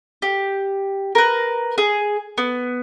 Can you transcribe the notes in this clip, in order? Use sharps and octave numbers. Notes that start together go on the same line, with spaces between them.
G4
A#4 B4
G#4
B3